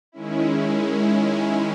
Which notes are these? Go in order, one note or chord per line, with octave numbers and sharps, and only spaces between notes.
D#3 G#3 C#4 E4